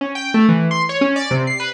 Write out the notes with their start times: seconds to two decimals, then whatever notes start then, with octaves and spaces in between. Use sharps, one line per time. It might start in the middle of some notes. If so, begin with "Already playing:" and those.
0.01 C#4
0.15 G5
0.34 A3
0.49 E3
0.71 C6
0.89 C#5
1.01 C#4
1.16 D5
1.31 C3
1.47 C7
1.60 B4